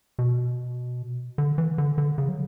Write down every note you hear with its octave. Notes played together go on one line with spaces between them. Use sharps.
B2
D3
E3
D3
D3
C#3
F#3